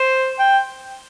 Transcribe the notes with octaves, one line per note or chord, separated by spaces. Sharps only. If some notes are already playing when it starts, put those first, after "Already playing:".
Already playing: C5
G5